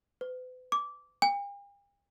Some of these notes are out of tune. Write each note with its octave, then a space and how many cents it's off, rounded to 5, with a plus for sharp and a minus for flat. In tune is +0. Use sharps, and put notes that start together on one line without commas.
B4 +45
D6 -15
G5 +45